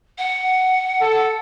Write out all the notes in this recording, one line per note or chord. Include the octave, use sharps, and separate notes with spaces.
F#5
A4